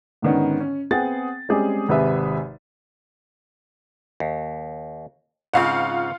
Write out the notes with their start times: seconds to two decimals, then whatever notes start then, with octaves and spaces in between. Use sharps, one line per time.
0.22 G#2 D3 D#3 B3 C#4
0.60 C#4
0.91 B3 C4 G#4 F#5 G5 A6
1.49 G3 G#3 C4 C#4 G4 G#4
1.89 G#1 C3 G#4 B4 E5
4.20 D#2
5.53 G#2 C#3 C4 F4 F5 F#5